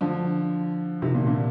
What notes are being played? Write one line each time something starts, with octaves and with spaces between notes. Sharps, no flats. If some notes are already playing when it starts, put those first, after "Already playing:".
D3 F3
C3 D#3
A#2 D3
A#2 D3